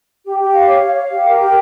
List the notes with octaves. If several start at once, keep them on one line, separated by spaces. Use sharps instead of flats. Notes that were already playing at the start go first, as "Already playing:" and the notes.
G4
G4
F5
C#5
F5
F5
G4
A#4
G4